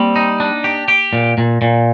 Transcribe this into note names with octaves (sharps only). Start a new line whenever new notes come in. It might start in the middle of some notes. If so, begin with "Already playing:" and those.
Already playing: G3 A#3 C4
D#4
D4
G4
G4
A#2
A#2
A#2